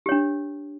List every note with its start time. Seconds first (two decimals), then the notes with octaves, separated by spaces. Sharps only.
0.06 G4
0.09 C#5
0.12 D4